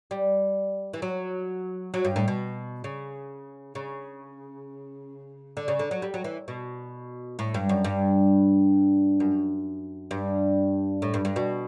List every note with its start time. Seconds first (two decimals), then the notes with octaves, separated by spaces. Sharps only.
0.11 G3
0.93 E3
1.02 F#3
1.94 F#3
2.05 G2
2.16 A2
2.28 B2
2.84 C#3
3.75 C#3
5.57 D3
5.68 C#3
5.79 D3
5.91 F#3
6.02 G3
6.14 F#3
6.24 E3
6.48 B2
7.39 A2
7.54 G2
7.69 F#2
7.85 G2
9.20 F#2
10.11 G2
11.02 A2
11.14 G2
11.25 G2
11.36 B2